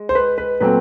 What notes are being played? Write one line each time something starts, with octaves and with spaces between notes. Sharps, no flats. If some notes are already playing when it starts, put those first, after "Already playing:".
Already playing: G#3
C5
B4
B4
A#2 F#3 A3 C4 B4